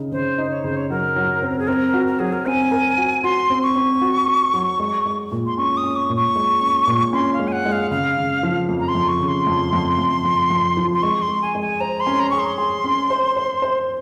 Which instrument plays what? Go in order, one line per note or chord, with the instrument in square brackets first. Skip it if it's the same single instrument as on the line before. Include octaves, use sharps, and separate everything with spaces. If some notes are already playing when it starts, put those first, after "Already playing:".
Already playing: [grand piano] C#3 D#4
[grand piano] C#3 [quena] C5
[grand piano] D#4
[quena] C#5
[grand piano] C#3 [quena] C5
[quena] C#5
[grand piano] F#3 [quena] A#4
[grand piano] F#3
C4
[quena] G#4
[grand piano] C4 [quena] A#4
[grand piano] F#4
[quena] A#4
[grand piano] F#3 [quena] G#4
[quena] A#4
[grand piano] C4 [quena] G#5
[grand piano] A#4
F#4
[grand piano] F#4 [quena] C6
[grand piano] C4
[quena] C#6
[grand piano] C4
F#4
F#4
F#3
G#3
G#3
A#2
[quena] C6
[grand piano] C#4 [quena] C#6
[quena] D#6
[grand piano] C#4
[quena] C#6
[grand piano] A#2
[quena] C#6
[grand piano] G#3
C#4
A#2
[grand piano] C#4 [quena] C6
[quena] F5
[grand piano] G#3
[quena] G#5
F#5
[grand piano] G#3
[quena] F5
[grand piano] C#3 [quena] F5
[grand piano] C#3
F3
F2
[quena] A#5
C6
[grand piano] F2
[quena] C#6
[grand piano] C#3
[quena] C6
[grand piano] F2
F2
F2
F2
F2
F3
[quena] C6
[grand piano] G#3 [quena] C#6
[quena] C6
[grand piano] G#3
[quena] G#5
[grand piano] G#3
[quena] G#5
[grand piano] C5 [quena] A#5
[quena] C6
[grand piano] C#4
[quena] A#5
[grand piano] G#4 [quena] C#6
[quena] C6
[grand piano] G#4
C#4
C5
C5
C5